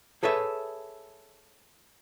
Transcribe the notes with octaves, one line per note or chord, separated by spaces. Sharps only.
G#4 A4 B4 C#5 E5